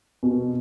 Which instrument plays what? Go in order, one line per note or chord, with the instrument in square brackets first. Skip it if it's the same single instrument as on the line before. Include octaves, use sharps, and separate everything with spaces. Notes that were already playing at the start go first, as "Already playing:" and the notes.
[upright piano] B2